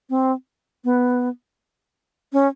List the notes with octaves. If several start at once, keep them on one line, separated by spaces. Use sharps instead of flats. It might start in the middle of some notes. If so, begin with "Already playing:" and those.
C4
B3
C#4